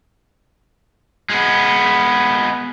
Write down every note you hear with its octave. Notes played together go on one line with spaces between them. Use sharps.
G#3 B3